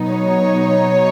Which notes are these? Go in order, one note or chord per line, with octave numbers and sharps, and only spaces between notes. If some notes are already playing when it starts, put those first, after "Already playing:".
Already playing: B2 F#3 B3 D#4
C#5